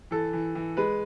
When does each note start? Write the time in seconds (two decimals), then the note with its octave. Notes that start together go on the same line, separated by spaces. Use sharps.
0.11 E3 A4
0.33 E3
0.55 E3
0.77 G#3 B4